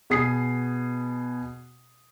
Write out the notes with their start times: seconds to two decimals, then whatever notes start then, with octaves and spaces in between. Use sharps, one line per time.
0.10 B2 G#4 D#6 C7